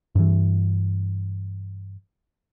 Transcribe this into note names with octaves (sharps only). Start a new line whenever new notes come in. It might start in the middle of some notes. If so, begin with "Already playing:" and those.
G2 E3